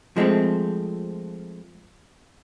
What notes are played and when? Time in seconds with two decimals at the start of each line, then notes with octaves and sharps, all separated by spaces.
0.16 F3 G#3 A3 C4